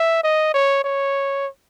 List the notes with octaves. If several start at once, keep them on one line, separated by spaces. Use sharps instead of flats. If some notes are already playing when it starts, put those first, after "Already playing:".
Already playing: E5
D#5
C#5
C#5